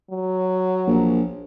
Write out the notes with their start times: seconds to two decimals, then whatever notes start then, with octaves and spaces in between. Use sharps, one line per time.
0.11 F#3
0.87 A#1